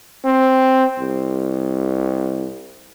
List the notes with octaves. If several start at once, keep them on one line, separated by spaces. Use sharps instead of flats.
C4
C2